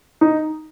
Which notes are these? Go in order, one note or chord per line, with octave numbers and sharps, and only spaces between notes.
D#4